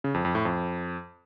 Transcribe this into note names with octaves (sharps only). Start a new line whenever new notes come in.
C#3
F2
F2
A2
F2